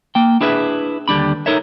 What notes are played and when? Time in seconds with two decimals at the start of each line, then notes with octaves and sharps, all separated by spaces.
0.15 A#3 G5
0.41 D4 E4 G#4 B4 E5
1.08 D#2 D3 G3 D4 B5
1.46 D#4 A4 A#4 C#5 E5